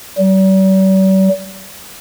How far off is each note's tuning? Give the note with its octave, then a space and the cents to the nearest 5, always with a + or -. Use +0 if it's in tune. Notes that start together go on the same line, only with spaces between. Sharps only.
G3 -45